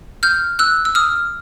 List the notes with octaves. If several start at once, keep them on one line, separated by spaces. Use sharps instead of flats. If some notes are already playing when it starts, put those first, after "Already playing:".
F6 G6
E6 F#6
E6
D#6 F6